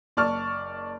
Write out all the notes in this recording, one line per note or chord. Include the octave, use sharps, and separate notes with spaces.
F#1 D5 A5 C#6 F6